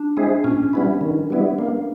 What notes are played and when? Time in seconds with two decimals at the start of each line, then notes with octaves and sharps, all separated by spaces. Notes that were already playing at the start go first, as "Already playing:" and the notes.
Already playing: D4
0.17 G#3 C4 E4 G#4
0.44 A#2 C#4
0.73 G3 B3 E4
1.01 D#3
1.30 G3 B3 E4
1.59 A#3